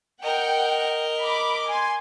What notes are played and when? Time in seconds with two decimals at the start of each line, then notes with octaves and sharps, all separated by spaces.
0.22 A#4 D#5 F#5 G5
1.21 B5 D6
1.68 G#5 C6